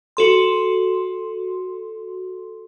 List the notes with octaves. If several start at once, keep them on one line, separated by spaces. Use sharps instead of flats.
F#4 A4 C6